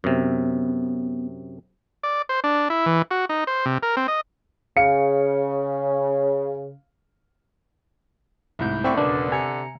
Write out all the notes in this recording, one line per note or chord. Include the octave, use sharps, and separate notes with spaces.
F#2 C3 B3
D5
C5
D4
E4
E3
F#4
D#4
C5
C3
A#4
C4
D#5
C#3 F5 C#7
C2 G#2 A3 E4 G6
D3 C4 E5 B5 C#6
E1 C#3 D4 A#4 B4 D5
C3 G#5 A#5 C#7